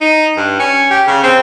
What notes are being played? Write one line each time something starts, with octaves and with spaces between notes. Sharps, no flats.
D#4
G2
C#4
G4
C#3
C4